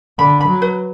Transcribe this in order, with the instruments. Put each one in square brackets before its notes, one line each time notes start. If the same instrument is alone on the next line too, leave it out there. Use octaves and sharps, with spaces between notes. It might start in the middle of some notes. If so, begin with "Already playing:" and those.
[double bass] D3 [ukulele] B5
[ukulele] B5
[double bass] F#3
[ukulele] B4